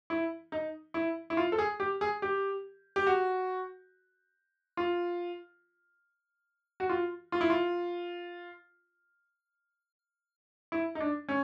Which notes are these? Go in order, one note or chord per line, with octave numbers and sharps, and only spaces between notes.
E4
D#4
E4
E4
F4
A4
G#4
G4
G#4
G4
G4
F#4
F4
F#4
F4
F4
E4
F4
E4
D#4
D4
C#4